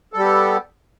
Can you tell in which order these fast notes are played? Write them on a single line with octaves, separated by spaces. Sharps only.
A4 G3 G4 B3